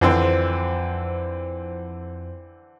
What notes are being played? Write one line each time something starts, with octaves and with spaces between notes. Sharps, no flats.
F2 D3 E3 C4 C5